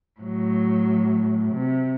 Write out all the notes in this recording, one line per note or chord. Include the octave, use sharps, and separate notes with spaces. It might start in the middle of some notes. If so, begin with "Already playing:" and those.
A2 F#3
C3